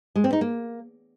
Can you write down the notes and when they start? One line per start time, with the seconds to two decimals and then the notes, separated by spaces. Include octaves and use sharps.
0.16 G#3
0.24 C4
0.33 D#4
0.41 A#3